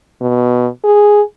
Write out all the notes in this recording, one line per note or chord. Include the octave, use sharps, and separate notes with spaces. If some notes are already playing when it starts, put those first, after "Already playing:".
B2
G#4